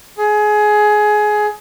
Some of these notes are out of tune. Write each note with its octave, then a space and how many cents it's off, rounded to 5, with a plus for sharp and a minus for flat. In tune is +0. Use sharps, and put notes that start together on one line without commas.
G#4 +20